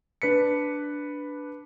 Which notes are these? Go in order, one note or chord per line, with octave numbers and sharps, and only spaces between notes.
D4 B4 B6 C#7